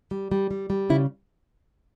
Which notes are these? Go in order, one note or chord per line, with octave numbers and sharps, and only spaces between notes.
G3
G3
G3
G3
C#3 E4